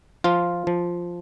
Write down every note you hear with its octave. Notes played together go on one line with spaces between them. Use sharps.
F3 F4
F3